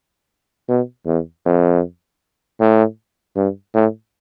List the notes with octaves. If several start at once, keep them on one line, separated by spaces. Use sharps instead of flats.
B2
E2
F2
A2
G2
A2